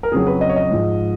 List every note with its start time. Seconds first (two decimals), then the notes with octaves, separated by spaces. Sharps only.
0.03 A#4
0.12 F2 C#3 F#3 G#4
0.27 B4
0.41 D#5
0.49 C#5
0.56 D#5
0.70 G#2 F3 G#3